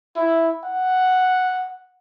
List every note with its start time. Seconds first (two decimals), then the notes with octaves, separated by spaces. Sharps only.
0.16 E4
0.65 F#5